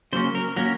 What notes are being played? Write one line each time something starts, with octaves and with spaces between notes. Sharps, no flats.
C#3 F#3 A#3 C#4 C5
A#4
F#3 A#3 C#4 A#4